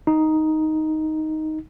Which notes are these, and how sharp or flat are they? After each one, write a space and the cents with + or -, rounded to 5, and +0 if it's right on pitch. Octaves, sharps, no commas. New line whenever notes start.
D#4 +5